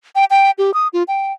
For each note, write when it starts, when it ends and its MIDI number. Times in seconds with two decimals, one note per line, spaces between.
0.15 0.25 79
0.30 0.51 79
0.58 0.73 67
0.74 0.88 87
0.93 1.03 65
1.08 1.33 79